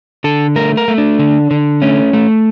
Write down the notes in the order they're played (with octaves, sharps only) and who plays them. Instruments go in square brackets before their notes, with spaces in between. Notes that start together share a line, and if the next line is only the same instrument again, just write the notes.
[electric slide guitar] D3 A4
A3 A#4
A#4
A3
D4
D3
D3
A3 C#4
A3